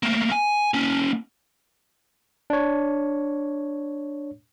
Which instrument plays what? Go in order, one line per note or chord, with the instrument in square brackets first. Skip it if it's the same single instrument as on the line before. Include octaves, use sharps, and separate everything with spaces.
[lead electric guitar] A3 A#3
G#5
A#3 C#4
[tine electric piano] D4 C#5